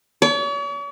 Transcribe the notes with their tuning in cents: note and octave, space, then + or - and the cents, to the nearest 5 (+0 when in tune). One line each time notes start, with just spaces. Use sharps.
C#5 +45